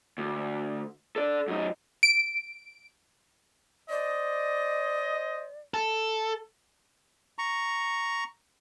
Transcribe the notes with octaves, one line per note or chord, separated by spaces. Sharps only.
D2
A4 D5
F#2 D#4
D7
C5 D5 D#5
A4
A#5 C#6